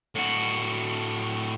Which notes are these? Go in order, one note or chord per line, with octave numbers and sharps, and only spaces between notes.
A2 F#4